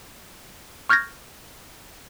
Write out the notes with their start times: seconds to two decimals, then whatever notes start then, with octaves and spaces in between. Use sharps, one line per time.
0.89 C#6 F6 G6 G#6 A#6